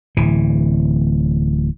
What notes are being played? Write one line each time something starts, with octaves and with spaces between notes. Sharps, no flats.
D1 E3